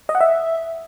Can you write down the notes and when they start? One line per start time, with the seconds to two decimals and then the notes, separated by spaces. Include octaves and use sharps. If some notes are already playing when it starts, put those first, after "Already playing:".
0.09 D#5
0.15 F#5
0.21 E5